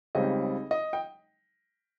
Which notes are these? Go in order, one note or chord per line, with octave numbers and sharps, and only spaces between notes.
C#2 C#3 G3 C4 D#4 D#5
D#5
G5